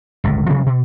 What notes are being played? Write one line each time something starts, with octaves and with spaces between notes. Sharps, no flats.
G1 C#2 A2
C3 F3 G3 C#4
B2